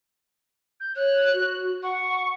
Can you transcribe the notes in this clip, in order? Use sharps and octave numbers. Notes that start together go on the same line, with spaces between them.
G6
C#5 F#6
F#4
F#5 C#6